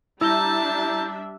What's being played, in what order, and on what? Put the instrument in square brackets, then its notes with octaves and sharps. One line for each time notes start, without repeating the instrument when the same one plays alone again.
[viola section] G3 D4 E5 [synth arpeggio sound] E4 A#5 G6 [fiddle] A5 [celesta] E6